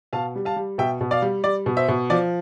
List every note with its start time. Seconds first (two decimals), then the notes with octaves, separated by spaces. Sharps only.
0.13 B2 F5 A5
0.36 G3
0.45 F5 A5
0.56 G3
0.78 B2 E5 G5
1.01 B2
1.11 D5 F5
1.22 G3
1.44 G3 D5
1.66 B2
1.77 C5 E5
1.88 B2
2.10 F3 D5